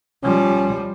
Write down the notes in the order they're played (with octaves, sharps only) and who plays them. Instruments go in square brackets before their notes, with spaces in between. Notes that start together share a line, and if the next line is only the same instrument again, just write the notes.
[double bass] F3 G3 [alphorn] C#4